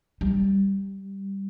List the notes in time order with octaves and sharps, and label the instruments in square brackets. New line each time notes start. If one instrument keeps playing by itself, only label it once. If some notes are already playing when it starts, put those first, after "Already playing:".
[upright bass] G3